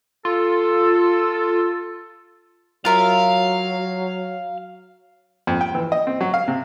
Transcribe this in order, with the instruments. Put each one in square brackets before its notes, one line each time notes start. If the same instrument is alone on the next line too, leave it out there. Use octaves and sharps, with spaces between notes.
[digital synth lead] F4 [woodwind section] A4
[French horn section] F#3 [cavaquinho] F4 A#4 E5 [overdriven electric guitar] F5
[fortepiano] F2
G5
E3
D#5
C4
F#3
F5
C3